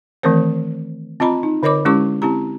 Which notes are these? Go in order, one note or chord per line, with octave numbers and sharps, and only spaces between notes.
D#3 E3 A3 C4 A#4 C5
C4 F4 D#5 A#5 B5
D#4
D3 A#4 C#5 D#5 B5 D6
G#3 C#4 E4 G4 C#6 D6
C4 E4 G4 A#5